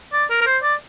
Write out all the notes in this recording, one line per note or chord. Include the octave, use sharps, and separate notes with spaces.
D5
A#4
A#4
C5
D5